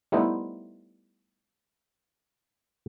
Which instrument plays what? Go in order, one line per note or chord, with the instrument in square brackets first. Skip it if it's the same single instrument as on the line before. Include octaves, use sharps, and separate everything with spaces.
[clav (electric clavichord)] G3 A3 B3 D#4 E4 C5